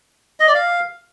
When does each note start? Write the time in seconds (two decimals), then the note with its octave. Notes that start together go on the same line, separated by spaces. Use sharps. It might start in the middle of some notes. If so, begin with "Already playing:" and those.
0.40 D#5
0.47 D5
0.54 F5